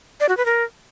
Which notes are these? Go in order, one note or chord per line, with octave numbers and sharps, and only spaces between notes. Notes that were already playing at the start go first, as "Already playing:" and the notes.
D5
F#4
B4
A#4